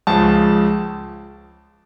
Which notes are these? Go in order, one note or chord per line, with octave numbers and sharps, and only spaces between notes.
C#2 C#3 F3 A5